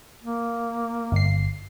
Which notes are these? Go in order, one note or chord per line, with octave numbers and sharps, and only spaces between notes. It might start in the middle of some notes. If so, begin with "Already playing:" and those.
A#3
G1 C7